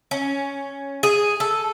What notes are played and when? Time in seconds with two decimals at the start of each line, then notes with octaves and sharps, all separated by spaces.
0.11 C#4
1.03 G#4
1.40 A4